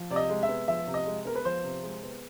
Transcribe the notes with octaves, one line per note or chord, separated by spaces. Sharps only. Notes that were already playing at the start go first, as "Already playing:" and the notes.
Already playing: F3
C3 D5
D#5
G#3
E5
B3
F3 E5
C3
D#5
G#3
B3 A#4
B4
F3 C5
C3
G#3
B3